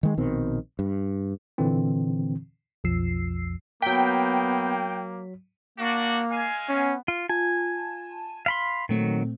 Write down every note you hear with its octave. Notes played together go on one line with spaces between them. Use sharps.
D#3 G#3
A#1 B2 D#3 C4
G2
A#2 D3 E3 C4
B1 F2 F3 E6 C7
F#3 A#3 B3 G5 B6
A#3 D4 F#4
G#3 F5 G#5
B3 C#4
F4
F4 G#5 A5
F5 B5 C6
A#2 D#3 F#3 A3 C4